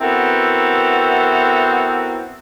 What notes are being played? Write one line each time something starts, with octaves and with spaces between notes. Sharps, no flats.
B3 C4 E4 F#4 A4 A#4